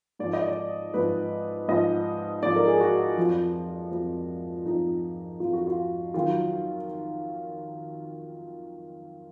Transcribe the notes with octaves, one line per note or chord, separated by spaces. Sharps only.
G#2 F3 D5
D#5
D5
G#2 F3 B4
G#2 F3 D#5
G#2 F3 D5
A#4
G#4
F#4
F2 F3
F2 F3
F2 F3 D#4
F2 F3 F4
F#4
F4
D#3 F#3 F4